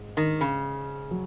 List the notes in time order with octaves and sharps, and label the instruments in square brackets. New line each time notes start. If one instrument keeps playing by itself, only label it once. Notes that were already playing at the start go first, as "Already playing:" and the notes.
Already playing: [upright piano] G#2 G#3
[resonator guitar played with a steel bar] D#3
C#3
[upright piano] F#3